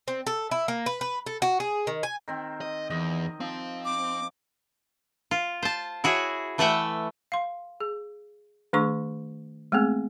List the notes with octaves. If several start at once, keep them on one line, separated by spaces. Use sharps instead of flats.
C4
A4
E4
A#3
B4
B4
A4
F#4
G#4
D#3
G#5
D#3 C4
D#5
E2 D#5
F3 C4
D6
F4
C5 A5
E4 F#4 G#4 C#5
E3 A3 B4 E5 F#5 G5
F5 C6
G#4
D#3 A3 D4 G#4 C#6
G#3 A3 B3 C4 G#4